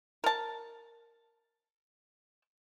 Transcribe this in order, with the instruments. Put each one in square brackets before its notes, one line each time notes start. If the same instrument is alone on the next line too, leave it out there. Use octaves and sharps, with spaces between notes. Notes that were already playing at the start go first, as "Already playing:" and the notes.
[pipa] A#4 A5